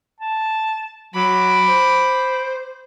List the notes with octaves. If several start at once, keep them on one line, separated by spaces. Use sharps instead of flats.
A5
F#3 B5 D6
C5